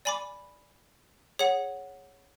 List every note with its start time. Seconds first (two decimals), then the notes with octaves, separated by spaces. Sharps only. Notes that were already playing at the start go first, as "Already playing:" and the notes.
0.05 D5 G#5 B5 D6
1.39 G#4 C#5 F#5